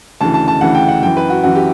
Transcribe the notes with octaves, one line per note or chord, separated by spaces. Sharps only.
D2 C#3 E3 A5
A5
A5
D2 C#3 E3 F#5
G5
F#5
F#2 E3 G5
B4
F#4
F#2 E3 F#4
G4